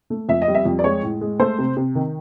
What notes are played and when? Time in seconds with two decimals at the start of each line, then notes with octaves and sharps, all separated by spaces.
0.10 A3
0.29 F2 E5
0.42 D#5
0.48 G3
0.55 E5
0.65 F2
0.79 D5
0.84 G#3 C#5
1.03 A2
1.21 G#3
1.39 A3 C5
1.58 C3
1.77 C3
1.95 D#3